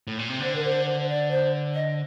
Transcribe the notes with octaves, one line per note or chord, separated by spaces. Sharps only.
A2
A#2
C3
D3 C5
A#4
C5
C5
C5
D5
C5
D#5